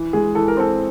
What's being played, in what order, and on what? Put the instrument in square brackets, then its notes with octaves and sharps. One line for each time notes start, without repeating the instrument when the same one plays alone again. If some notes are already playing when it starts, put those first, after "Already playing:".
Already playing: [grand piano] E3
[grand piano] G#3 [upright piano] G#4
[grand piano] E3 [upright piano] A4
[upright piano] A#4
[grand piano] C4 [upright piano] A4